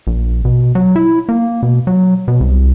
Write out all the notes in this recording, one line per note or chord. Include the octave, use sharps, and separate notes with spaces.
A#1
B2
F#3
E4
A#3
B2
F#3
B2
C2